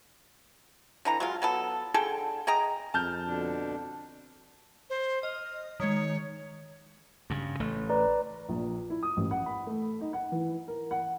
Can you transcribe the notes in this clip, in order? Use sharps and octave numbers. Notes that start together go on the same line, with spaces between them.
D3 E3 A#5
F#3 G#3 F4
F#3 B3 A4
D3 G#4 A4 G5
G#4 D#5 G5 A#5
F2 A5 F6 G6
B2 D3 D4
C5
D#5 F6
D#3 G#3 C#5
G2 C#3
A1 A3
B4 D5 A#5
A#1
E4
D#6
A1
F#5
B5
A3
D#4
F#5
E3
A#4
F#5